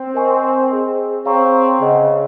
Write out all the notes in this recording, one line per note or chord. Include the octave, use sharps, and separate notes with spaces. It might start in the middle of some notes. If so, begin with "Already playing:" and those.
Already playing: C4
A#4 D#5 G#5 C#6
G#4 D#5 G#5
C4 G#4 C#5 F5 A#5 C#6
C#3 G#4 D#5 F#5